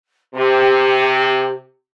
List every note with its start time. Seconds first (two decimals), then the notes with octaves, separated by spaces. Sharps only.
0.35 C3 G4